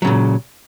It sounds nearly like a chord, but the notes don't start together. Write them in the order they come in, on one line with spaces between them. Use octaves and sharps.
F#3 C#3 A#2